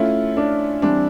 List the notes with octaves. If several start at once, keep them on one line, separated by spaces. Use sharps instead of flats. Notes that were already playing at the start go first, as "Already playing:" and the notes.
Already playing: A3 C#4 E4 F4
D4
E3 G3 C4 D4